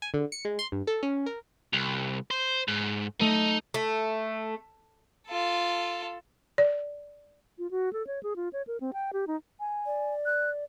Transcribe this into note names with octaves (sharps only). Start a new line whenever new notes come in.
G#5
D3
C#7
G#3
C6
G2
A4
C#4
A#4
C2
C5
G#2
A3 D#4
A3
F4 A4
D5
F4
F#4
A4
C#5
G#4
F4
C#5
A#4
C4
G5
G4
D#4
G#5
D5
F#6